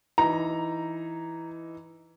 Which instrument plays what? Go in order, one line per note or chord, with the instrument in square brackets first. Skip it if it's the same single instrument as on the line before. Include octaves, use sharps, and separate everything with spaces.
[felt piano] E3 D#4 [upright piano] A#5